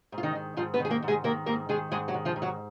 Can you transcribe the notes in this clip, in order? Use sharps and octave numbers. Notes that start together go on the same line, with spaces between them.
G#2
F4
D#3 D#4
D#3
G#2 F3 F4
B3 B4
D#3 G#4
A#3 A#4
G#2
G#3 G#4
D#3 A#3 A#4
G#2 A#3 A#4
D#3 G#3 G#4
G#2 G#3 G#4
F#3 F#4
D#3
F3 F4
G#2
F#3 F#4